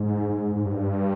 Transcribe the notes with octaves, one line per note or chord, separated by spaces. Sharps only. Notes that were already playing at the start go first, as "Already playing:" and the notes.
Already playing: G#2
G#2
G#2
G2